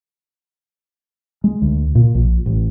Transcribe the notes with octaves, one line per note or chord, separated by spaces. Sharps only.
G#3
D2
A#2
A#1
A1